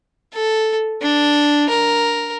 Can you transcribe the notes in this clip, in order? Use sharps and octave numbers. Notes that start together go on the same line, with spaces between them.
A4
D4
A#4